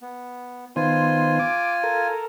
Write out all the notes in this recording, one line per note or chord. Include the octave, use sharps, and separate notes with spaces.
B3
D#3 B3 F4 C5 G#5
D6
A4 A#4